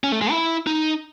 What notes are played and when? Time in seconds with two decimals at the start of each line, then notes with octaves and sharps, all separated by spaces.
0.04 C#4
0.12 A3
0.21 G#3
0.31 E4
0.67 D#4